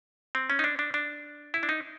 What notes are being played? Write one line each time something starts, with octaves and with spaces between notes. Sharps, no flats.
C4
C#4
D#4
D4
D4
D4
E4
D4
D#4